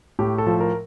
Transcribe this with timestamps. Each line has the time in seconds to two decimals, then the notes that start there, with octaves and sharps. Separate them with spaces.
0.19 A2 G4
0.38 A4
0.46 F3
0.60 A#4